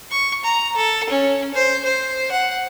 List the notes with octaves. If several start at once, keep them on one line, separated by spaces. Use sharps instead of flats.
C#6
A#5
A4
C#4
C5
C5
F#5